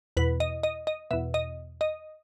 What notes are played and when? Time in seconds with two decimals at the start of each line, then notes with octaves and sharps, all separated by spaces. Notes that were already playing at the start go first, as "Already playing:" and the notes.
0.17 E2 B2 B4
0.40 D#5
0.63 D#5
0.87 D#5
1.11 E2 B2 E5
1.34 D#5
1.81 D#5